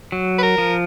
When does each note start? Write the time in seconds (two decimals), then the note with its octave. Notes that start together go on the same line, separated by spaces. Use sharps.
0.12 F#3
0.38 B4
0.42 A#4
0.58 F3